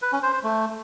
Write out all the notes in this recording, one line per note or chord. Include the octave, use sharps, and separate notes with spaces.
B4
C#4
C5
C5
A3